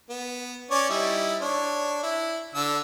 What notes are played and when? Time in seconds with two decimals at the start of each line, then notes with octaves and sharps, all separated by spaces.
0.10 B3
0.71 C#4 C#5 D5
0.90 G3 D#4 E4
1.41 D4 C#5
2.03 E4
2.55 D3 E6